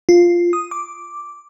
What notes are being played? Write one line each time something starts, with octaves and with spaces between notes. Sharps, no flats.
F4
D#6
D6